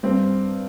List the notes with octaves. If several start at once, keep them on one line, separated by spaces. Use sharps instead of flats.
G2 C4